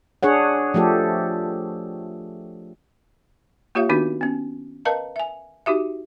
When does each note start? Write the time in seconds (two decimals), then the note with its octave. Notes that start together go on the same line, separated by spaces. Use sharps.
0.23 D4 G#4 C#5 F#5
0.74 F3 A3 G4 A4
3.75 A#3 F4 G4 C#5 E5 F5
3.89 D#3 B3 D4 D#4 F#4
4.21 B3 C#4
4.85 A#4 B4 D#5 F5 A5 A#5
5.16 E5 G#5
5.66 D#4 F#4 G4 E5